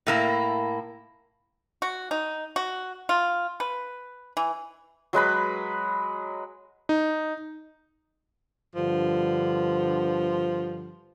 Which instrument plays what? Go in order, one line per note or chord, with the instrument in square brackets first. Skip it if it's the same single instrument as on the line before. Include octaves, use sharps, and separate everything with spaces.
[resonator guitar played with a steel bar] A2 A#3 E4
[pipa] F#4
D#4
F#4
F4
B4
E3
[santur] F#3 G#3 B4 B5
[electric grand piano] D#4
[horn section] G2 D3 F3